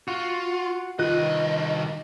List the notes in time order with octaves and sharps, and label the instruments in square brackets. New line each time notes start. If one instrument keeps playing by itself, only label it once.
[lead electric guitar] F4 [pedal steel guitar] F#4
[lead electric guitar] C2 D#5 [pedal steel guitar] D#3 B4 F#6 [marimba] F4